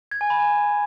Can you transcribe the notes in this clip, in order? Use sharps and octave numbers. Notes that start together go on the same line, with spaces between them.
G#6
G#5
B5
G#5